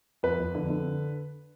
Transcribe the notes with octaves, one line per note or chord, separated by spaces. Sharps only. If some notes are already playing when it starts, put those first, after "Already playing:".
F2 B4
F2
D3
D3